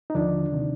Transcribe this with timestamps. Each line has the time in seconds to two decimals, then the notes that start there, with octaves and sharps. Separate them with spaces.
0.10 D#4
0.15 D#2 D3 F3 D4
0.52 C3 D#3